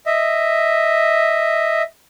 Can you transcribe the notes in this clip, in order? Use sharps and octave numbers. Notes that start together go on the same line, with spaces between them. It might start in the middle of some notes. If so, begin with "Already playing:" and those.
D#5 E5